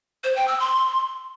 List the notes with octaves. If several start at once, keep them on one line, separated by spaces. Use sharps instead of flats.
C5
G5
E6
C6